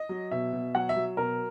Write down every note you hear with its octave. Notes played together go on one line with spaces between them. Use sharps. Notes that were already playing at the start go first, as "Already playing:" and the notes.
Already playing: D#5
F#3
B2 E5
B2
F#3 F#5
E5
F#3
B2 A#4